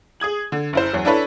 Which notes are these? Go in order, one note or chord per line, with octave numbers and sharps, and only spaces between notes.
G#4 D#6 G#6 F#7
D3
F#1 E4 C5
E2 F#3
D4 E4 A4 B4 C#5